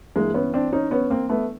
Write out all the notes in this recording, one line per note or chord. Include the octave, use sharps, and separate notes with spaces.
G2 E3 G#3 A#3
B3 C#4
C4 D4
C#4 D#4
B3 C#4
A#3 C4
A3 B3